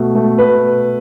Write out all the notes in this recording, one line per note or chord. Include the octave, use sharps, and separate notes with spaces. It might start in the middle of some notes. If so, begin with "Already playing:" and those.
Already playing: B2 A3
A3
B2 B4